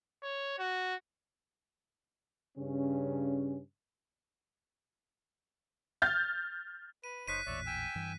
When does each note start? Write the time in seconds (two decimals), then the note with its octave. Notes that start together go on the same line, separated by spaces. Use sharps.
0.23 C#5
0.59 F#4
2.57 G2 C#3 C#4
6.02 F6 G6 A6
7.04 B4 D#7
7.27 F#1 D#4 C5 C#5 F#6 B6 D#7
7.46 A1 E2 A#2 C#5 D5 E5
7.66 G5 G#5 E6
7.95 G2 E3